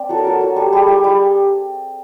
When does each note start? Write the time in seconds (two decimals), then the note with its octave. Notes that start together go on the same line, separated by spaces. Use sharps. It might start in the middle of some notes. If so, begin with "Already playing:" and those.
Already playing: C4 D5
0.09 F#3 A4
0.18 A#4
0.25 F#3 A4
0.41 F#3
0.56 G3 A4
0.72 G3 G#4
0.88 G3
1.04 G3